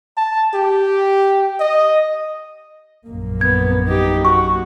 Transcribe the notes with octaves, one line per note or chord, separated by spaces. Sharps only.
A5
G4
D#5
A#1 F#2 A#3
B3 G#6
D#4 G4
F#4 C#6